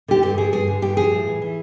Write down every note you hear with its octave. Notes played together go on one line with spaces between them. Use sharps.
D3 G4
G2 G4
F3 G#4
G2 G#4
D3
G2 G4
F3 G#4
A2
E3
E3